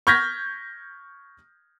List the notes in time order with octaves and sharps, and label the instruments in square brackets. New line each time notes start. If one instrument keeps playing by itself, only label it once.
[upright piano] C#6 F6 G6 G#6 A#6 B6